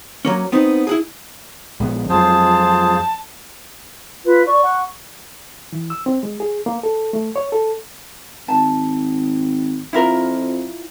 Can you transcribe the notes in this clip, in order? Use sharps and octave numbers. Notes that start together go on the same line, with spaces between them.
F#3 A#3 C#4
B3 C4 D#4
E4 F#4 G#4
A#1 G#3 B3
F2 F#3 G#3 F4 G#4 C5 A5
F4 B4
D5 C#6
F#5
E3
E6
C4
G#3
G#4
A#3
A4
A3
C#5
A4
G#1 A5
F2 E4 F4 A#4